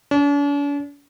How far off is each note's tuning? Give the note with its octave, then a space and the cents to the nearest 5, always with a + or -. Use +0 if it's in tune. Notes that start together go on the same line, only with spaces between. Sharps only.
D4 -45